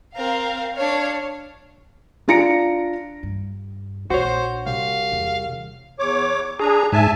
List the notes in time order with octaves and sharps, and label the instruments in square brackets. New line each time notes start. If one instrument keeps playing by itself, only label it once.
[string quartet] C4 A#4 [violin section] F5
[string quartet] D4 F5 [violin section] C#5
[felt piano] D4 F4 A#5 A#6 C#7 D7
[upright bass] G2
[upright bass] A#1 D4 [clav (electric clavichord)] F#4 C#5 [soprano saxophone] C5
[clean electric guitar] C2 [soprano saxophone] F5
[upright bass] E2
[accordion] E2 C#5 D6
[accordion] D4 A#5 [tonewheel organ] G#4
[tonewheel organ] G#2 [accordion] E5 G#5 A5